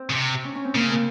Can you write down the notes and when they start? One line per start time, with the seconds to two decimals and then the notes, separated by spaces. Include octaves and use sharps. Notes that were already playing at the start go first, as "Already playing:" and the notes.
Already playing: C4
0.10 C#3
0.15 C3
0.45 C#4
0.55 C#4
0.65 C4
0.75 C#3 A#3
0.91 A#3